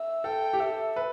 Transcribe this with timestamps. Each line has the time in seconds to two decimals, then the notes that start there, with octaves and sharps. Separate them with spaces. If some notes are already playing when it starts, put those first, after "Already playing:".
Already playing: E5
0.24 A4 G5
0.53 G4
0.60 A4 E5
0.96 B4